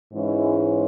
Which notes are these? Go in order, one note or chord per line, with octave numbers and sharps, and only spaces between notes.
G#2 E3 G#3 C#4 E4